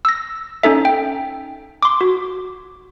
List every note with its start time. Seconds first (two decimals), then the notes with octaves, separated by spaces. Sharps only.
0.05 E6 A#6
0.63 C#4 D#4 A4 E5
0.85 G5
1.82 C6 D6
2.01 F#4